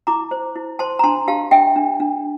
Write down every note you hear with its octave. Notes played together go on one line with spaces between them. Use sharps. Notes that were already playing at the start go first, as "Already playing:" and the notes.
E4 A#5 D6
C5
E4
C5 A5 C6
A#5
D4 A5 C6
G4 F5 A5
D4 E5 G5
D4
D4